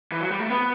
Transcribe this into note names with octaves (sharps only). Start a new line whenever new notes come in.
E3
F#3
G3
A3
B3